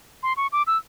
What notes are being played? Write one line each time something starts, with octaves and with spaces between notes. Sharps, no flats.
C6
C#6
D6
E6